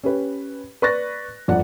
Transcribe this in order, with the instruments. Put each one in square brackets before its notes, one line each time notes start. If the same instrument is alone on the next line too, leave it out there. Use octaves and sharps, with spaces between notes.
[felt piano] C#4 G4 B4
B4 D5 C#6 F#6 A6 A#6
G1 F2 D5 F#5